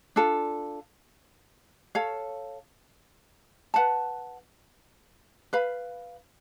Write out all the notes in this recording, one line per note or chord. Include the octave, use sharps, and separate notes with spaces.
D4 F4 A4
A4 C#5 F5
B4 F#5 A5
B4 F5 B5